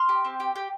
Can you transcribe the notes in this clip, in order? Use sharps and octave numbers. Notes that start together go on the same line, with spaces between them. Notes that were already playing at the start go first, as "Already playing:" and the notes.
Already playing: C6 F6
G4
C4
G4
G4